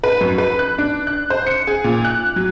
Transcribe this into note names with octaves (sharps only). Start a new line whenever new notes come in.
B4
F#2
B4
F#6
D4
F#6
C5
C#7
G#4
A#2
F#6
F#3